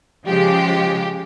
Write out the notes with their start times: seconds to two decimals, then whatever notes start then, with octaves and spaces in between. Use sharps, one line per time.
0.27 C#3 F3 G#3 G4